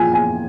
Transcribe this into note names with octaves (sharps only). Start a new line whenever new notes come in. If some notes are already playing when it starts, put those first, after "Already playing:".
Already playing: A#2 F3 G#5
G#5